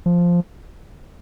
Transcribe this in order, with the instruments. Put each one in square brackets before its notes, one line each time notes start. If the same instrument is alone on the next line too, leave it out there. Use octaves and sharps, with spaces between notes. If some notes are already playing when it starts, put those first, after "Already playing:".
[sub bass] F3